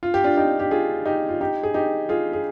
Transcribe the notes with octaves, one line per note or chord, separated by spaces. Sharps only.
F4
G4
D4 F4
D#4 G4
G4
F4 G#4
D#4 G4
F4
D#4 G4
G#4
D#4 G4
F4 G#4
G#4